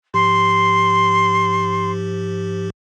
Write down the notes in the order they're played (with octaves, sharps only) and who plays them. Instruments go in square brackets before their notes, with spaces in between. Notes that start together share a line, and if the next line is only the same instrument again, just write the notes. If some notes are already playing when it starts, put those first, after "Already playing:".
[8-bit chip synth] G#2 F3 G4 [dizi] C6